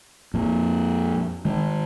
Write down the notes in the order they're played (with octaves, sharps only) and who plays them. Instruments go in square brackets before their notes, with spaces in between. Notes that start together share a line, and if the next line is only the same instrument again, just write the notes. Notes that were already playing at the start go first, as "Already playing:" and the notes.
[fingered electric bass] F2 A#2
D#3 G#3